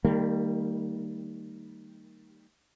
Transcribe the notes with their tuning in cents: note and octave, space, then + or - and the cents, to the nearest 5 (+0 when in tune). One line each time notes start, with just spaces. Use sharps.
D#3 +0 G3 +0 A#3 -40